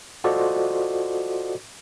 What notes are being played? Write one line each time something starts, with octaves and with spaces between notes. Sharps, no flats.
F4 F#4 A4 C5 D5 D#5